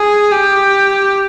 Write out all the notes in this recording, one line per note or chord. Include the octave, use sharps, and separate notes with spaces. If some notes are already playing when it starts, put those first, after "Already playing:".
Already playing: G#4
G4